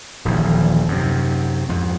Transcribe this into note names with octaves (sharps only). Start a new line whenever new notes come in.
D#1 A#1 D#2 E3
F#2 C3
F2 G#2